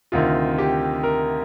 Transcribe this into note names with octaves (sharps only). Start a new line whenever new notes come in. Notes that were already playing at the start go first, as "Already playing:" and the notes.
D2 C3 D#3 F4
G4
A#4